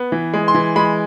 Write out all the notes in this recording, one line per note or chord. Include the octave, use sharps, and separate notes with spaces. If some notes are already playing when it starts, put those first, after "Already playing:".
Already playing: B3
E3
G#3
C6
E3
G#3 B5